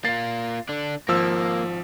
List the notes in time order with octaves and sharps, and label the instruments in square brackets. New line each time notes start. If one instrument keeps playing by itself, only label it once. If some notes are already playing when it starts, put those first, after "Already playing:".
[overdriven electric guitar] A#3 F4 [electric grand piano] A6 C7
[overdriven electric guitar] D3 D4
[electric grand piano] G#1 F3 E6 [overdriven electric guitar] A#3